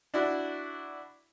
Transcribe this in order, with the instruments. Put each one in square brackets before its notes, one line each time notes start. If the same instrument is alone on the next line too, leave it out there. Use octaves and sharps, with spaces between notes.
[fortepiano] D4 E4 F#4